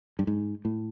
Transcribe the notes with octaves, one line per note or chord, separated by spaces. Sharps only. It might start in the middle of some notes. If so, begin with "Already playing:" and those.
G2
G#2
A2